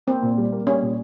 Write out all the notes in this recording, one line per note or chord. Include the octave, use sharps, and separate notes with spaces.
A#3 C4
A#2
G3
A#3
G3 C#4
A#2